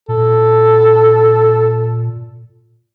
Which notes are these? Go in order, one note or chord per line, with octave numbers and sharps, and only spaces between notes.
A#2 A4